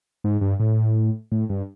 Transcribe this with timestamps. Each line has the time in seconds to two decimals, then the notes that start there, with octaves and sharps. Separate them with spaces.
0.24 G#2
0.41 G2
0.60 A2
1.32 A2
1.50 G2